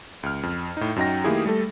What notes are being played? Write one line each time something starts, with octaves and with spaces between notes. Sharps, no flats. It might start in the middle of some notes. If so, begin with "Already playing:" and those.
C#2 F6
F2
A2 D#4
F#2 F#3 D#4 G5 A#6
D#3 A3 A#3 E4 G4 G#4
G3 A3 A4